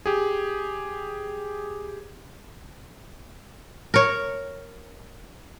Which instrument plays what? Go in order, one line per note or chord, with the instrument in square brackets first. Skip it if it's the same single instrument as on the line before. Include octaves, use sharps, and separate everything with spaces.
[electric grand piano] G4 G#4
[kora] A#4 C#5